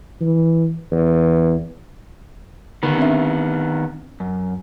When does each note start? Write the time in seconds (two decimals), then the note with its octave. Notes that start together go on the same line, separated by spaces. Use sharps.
0.21 E3
0.91 E2
2.83 D3 D#3 B3
2.98 C4 D4 E5
4.20 F#2